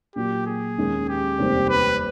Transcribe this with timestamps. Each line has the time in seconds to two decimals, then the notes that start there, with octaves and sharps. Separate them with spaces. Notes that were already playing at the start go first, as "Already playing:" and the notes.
0.16 A#2 F#3 A#3 G4
0.46 G#4
0.78 D#2 D#3 G#3 C#4
1.08 G4
1.38 F1 D#2 D#3 G3 C4
1.69 B4